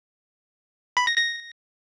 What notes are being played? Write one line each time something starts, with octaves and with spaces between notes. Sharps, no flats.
B5
A#6
A#6